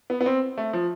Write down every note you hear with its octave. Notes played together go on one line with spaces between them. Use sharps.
B3
B3
C4
A3
F3